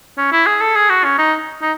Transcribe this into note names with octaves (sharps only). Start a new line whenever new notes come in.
C#4
E4
G#4
A4
G#4
F#4
C#4
D#4
D#4